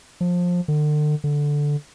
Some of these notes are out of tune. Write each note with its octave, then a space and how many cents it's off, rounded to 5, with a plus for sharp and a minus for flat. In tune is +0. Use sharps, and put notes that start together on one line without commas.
F3 +20
D3 +40
D3 -5